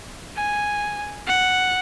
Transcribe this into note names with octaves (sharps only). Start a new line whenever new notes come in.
G#5
F#5